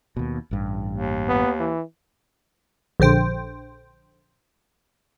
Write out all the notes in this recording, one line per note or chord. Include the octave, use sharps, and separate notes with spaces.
D#2 B2
A1 G2
D#2
B3
E3
A#1 D3 C5 G5